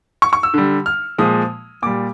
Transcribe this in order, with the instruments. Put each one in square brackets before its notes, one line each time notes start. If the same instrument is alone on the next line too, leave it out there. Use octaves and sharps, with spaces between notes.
[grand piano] C#6
C#6
E6
D3 G3
F6
A#2 F3 G#3 D#6
A#2 G3 D6